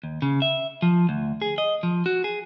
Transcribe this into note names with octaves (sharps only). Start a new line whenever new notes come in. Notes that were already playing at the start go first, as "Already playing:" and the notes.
D#2
C#3
E5
F3
D2
G#4
D#5
F3
F#4
G#4